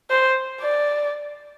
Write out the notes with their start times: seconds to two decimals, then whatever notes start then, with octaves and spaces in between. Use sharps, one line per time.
0.10 C5
0.61 D5